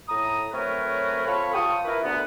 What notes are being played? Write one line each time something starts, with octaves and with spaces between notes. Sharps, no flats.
A2 A#5 D#6
F#3 A3 C4 A#4 B4 C#5
C4 F4 A4 C#5 F5 B5
F4 G5 A5 C#6 D#6
E4 A#4 B4
D2 B3